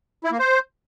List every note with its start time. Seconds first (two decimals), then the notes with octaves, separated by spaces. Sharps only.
0.24 E4
0.32 A#3
0.39 C5